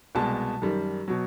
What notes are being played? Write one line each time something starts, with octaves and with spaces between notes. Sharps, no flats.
C2 B2 G#3 A5
F#2 D#3 G3
B2 F#3